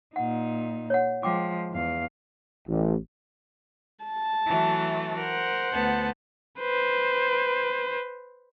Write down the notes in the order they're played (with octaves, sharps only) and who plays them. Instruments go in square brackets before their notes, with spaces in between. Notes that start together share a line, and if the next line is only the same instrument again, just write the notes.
[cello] A#2 D#4 [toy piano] F#5
[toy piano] C#5 F#5
[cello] F3 G#3 [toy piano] G5 D6
[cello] E2 F5
[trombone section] A1
[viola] A5
[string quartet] E3 F#3 A3
[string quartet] A#4 [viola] C5 F#5
[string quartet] D2 B3 A5
[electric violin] B4 C5